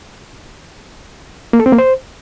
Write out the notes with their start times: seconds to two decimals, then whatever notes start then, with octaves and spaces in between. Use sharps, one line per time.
1.53 A#3
1.60 A4
1.66 C4
1.72 A#3
1.78 C5